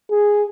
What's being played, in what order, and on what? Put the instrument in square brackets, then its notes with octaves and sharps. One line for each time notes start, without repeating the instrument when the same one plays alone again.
[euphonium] G#4